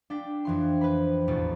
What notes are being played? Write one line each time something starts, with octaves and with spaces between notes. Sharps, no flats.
D4 G5 B6
F2 E3 C6
B4 C5 B5
A1 E2 B2